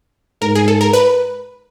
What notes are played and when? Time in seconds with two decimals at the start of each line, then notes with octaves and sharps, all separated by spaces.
0.42 G#2 A#4
0.55 G#4
0.68 A4
0.81 A#4
0.93 B4